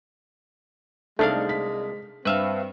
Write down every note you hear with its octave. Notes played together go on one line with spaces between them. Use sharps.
C2 G#3 A3 D4 D#4 F5
B6
G2 C4 B4 E5 F5